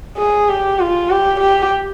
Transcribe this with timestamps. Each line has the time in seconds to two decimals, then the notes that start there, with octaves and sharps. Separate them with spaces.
0.17 G#4
0.49 G4
0.79 F4
1.10 G4
1.40 G4